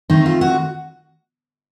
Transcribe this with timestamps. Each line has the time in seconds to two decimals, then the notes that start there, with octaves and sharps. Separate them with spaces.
0.10 D#3 A3 C4 D#4
0.26 F4
0.41 F#4